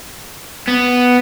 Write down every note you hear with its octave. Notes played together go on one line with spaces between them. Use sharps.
B3